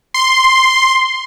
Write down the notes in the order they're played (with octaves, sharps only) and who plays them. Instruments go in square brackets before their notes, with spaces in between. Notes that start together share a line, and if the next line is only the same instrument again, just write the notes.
[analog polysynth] C6